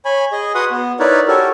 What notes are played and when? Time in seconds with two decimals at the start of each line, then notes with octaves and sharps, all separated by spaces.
0.05 C#5 G#5 B5
0.32 G#4 D#5
0.55 F#4 B4 F#5 C6 D#6
0.71 B3
1.00 D#4 E4 A#4 B4 C#5 D5
1.28 F#4 G4 A4 A#4 C#5